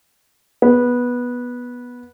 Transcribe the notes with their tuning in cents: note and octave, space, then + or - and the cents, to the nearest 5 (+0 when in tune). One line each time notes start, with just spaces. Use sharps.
B3 -10